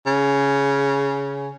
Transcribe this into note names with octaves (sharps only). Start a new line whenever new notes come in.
C#3